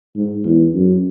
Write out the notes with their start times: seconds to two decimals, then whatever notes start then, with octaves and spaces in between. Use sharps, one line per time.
0.16 G#2
0.45 E2
0.74 F#2